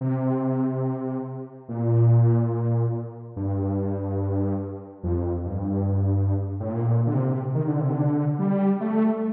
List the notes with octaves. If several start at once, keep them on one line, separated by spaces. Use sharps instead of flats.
C3
A#2
G2
F2
G2
A2
A#2
D3
C3
D#3
D3
C3
D3
G3
A3